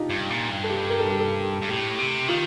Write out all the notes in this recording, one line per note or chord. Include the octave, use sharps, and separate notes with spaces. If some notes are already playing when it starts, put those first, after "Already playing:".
Already playing: D4 D#4 F4 G4
G2
A#2
G2
A4
G4
A#4
A4
G4
A4
G2
A2 G4
C3
D#3 F4